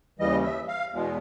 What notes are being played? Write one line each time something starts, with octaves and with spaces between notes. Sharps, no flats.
D#2 C#3 E3 G3 D#5
E5
F5
E2 B2 G#3